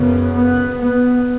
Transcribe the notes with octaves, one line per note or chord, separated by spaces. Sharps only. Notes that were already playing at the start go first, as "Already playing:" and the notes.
Already playing: F#2 C#3 B3
B3
B3